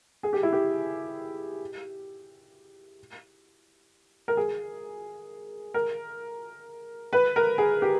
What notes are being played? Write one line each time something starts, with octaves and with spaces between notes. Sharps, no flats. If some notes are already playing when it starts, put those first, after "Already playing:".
G#4
G4
E4
G4
A#4
G#4
A#4
B4
A#4
G#4
G4